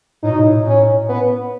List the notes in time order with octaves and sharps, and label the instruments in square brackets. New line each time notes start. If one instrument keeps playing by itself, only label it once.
[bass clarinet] A2 [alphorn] D#4
[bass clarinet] B2
A2
[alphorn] C#4
B3